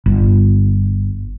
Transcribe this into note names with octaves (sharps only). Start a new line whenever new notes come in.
G1